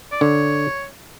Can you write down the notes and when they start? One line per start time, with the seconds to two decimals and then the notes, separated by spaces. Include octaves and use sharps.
0.12 D5
0.21 D3 C#5